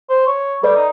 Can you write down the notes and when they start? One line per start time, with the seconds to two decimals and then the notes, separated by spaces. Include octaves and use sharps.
0.09 C5
0.27 C#5
0.63 G3 A4 B4 D5
0.75 D#4